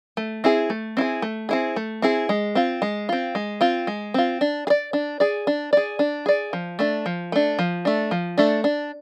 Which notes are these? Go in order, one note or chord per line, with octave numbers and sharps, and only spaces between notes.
A3
C4 E4 G#4
A3
C4 E4 G#4
A3
C4 E4 G#4
A3
C4 E4 G#4
G#3
C4 F4
G#3
C4 F4
G#3
C4 F4
G#3
C4 F4
D4
G#4
D5
D4
G#4 D5
D4
G#4 D5
D4
G#4 D5
F3
A3 D4
F3
A3 D4
F3
A3 D4
F3
A3 D4
D4